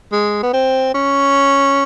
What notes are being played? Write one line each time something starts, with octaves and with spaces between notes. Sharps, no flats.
G#3
B3
C4
C#4